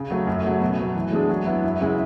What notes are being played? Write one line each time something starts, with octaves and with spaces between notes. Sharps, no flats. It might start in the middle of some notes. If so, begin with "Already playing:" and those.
Already playing: C#3
F#3 A3
F#2
C#3 F#3 A3
B2
F#3 A3
E3
G#3 D4 G#4
F#3
B3 E4
F#2
C#3 G#3 C#4 E4